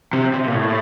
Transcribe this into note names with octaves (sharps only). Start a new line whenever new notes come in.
C3
C3
A#2
A2